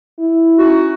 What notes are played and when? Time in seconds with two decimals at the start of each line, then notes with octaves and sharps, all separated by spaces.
0.19 E4
0.58 C#4 D#4 F#4